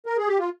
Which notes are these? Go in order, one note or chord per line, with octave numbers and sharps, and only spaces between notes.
A#4
G#4
G4
F4